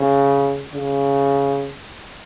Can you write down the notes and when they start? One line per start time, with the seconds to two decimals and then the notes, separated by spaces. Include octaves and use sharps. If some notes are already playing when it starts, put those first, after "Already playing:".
Already playing: C#3
0.73 C#3